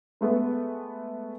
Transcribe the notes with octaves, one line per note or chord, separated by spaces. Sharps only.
G#3 A3 B3